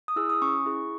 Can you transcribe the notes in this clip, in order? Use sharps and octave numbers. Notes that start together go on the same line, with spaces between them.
D#6
E4 G#4 E6
D#6
C#4 C#6
E4 G#4